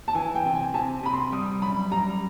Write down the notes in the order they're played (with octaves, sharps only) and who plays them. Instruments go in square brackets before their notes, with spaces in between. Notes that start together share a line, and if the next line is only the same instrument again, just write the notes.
[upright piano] A5
[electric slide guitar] E3 [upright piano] G#5
[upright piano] G5
[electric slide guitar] C3
[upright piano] G#5
[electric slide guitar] C3 [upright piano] A5
[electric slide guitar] C3 [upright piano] B5
[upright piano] C6
[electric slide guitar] G3 [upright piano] D#6
[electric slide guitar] F#2 [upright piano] B5
[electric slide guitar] G3 [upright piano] A#5